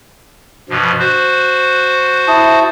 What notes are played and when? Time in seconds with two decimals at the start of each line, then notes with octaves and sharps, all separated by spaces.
0.70 G2 B2 F3
0.99 F#4 C5 F#6
2.28 E4 A5 D#6